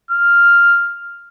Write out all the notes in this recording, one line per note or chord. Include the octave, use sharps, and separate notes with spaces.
F6